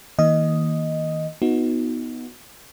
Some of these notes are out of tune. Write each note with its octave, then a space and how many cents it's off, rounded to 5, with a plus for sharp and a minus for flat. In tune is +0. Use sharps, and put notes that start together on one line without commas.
D#3 +40 A#3 +0 D#5 +0
B3 +0 D#4 +15 F#4 -20